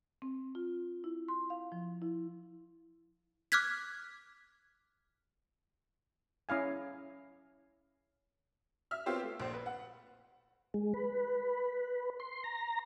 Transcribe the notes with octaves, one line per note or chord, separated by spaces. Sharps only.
C4
F4
E4
C6
F5
F3
E4
D6 F6 F#6 G#6 B6
C#4 E4 F5 G#5
E5 E6 F6
B3 C4 F4 G4 C5 C#5
A3
A#1 C5
B4
F#5
G#3
B4
C6
A#5